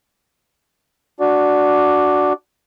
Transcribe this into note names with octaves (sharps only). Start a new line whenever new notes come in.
D4 F#4 D5